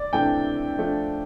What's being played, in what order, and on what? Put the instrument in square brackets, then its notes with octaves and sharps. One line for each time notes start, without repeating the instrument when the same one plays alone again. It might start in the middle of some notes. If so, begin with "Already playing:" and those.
Already playing: [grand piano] D5
[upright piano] C3 E3 A3 D4 [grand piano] G5
[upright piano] F3 A3 D4